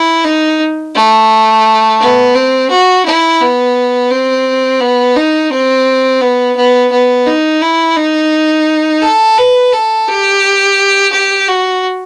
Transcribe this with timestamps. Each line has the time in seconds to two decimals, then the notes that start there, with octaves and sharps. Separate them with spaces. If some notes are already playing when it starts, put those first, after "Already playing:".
Already playing: E4
0.24 D#4
0.94 A3
2.00 B3
2.35 C4
2.70 F#4
3.05 E4
3.41 B3
4.11 C4
4.80 B3
5.16 D#4
5.50 C4
6.21 B3
6.56 B3
6.92 B3
7.27 D#4
7.62 E4
7.96 D#4
9.02 A4
9.38 B4
9.73 A4
10.08 G4
11.12 G4
11.48 F#4